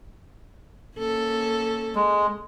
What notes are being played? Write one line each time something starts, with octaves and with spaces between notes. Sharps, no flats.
A#3 C#4 A4
G#3